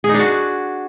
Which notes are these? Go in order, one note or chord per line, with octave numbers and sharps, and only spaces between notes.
G#4
D#4
D4
F#4